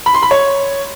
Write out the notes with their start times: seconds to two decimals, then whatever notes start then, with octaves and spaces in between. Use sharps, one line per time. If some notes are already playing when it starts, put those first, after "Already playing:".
0.06 B5
0.14 C6
0.23 B5
0.31 C#5